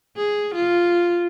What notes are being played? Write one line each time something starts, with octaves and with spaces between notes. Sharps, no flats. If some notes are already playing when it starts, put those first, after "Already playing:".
G#4
F4